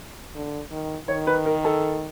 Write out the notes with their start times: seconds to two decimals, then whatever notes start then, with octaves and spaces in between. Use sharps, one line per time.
0.35 D3
0.71 D#3
1.08 D#3 C#5
1.27 B4
1.45 A#4
1.65 A4